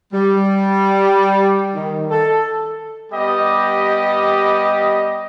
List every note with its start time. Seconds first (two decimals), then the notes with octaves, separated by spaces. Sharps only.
0.13 G3
1.75 D#3
2.11 A4
3.13 G3 B3 G4 D#5